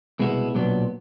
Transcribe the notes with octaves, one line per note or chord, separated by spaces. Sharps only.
C2 B2 G#3 B3 E4
B1 A#2 F#3 B3 D4